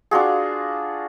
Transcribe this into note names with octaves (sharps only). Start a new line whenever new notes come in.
D4 F4 F#4 G#4